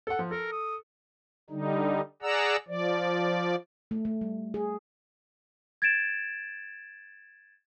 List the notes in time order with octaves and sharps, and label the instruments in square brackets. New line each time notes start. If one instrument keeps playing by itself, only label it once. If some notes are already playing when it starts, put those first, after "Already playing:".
[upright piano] A4 F#5
F3
[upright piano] A4 [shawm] A#4
[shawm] D#6
[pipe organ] D3 G3 D#4
G#4 D5 F#5 A#5 E6
F3 D5
[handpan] A3
A3
G3
G#4
[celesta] G#6 A6 D7 E7